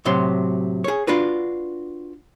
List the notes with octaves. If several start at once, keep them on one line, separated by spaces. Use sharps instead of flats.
A2 C3 F#3 C6
G#4 C#5
D4 F4 F#4 B4